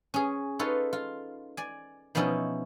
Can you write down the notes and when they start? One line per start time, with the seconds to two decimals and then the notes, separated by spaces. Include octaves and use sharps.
0.14 C#4 G#4
0.59 D#4 F4 A4 B4 C#5
0.93 F4
1.57 D5 G#5
2.15 B2 F3 B3 C#4 D#4 E4